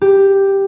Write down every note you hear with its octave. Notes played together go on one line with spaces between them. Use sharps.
G4